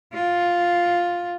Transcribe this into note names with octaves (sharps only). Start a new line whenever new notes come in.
F4